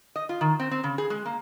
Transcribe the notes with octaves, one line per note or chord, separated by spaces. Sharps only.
D#5
F4
D#3
C4
C4
C#3
G#4
G#3
A#3